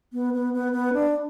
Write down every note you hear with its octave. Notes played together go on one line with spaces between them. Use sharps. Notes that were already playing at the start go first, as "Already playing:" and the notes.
B3
B3
B3
B3
D4